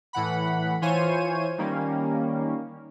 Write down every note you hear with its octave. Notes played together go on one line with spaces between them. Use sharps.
A2 E3 F#5 B5
E3 F4 C5 C#5 G#5 D#7
D#3 G3 A#3 C#4